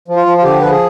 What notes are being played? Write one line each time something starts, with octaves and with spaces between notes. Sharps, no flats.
F3
F4
F3
F4
D3 G4
F3 B4
G#4